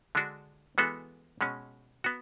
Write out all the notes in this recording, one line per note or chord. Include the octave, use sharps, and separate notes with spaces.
D3 G#3 D4 F#4
E3 G#3 B3 F#4 A4
B2 G#3 C#4
B3 F#4